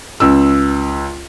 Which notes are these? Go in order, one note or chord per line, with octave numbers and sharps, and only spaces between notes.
C#2 E6